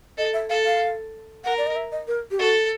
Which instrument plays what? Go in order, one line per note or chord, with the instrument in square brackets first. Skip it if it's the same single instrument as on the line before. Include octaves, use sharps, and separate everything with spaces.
[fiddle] A4 [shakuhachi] D#5
[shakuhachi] E5
[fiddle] A4 [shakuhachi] F5
[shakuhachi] F5
[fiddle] A#4 [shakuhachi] F#5
[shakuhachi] D5
D#5
E5
D#5
A#4
G4
[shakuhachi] F#4 [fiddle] A4